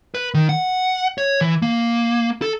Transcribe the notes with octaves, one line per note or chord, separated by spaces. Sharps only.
B4
D#3
F#5
C#5
E3
A#3
A4